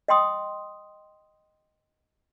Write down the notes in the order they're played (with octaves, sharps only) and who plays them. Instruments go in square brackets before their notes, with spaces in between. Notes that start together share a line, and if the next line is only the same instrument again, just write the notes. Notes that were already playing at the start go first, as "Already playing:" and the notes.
[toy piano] D#5 G5 C6 D#6